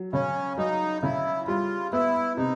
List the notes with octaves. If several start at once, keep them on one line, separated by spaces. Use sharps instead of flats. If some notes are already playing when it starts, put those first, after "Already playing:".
Already playing: F#3
C#3 C#4
F#3 D#4
C#3 E4
G3 F4
B3 E4
C3 D#4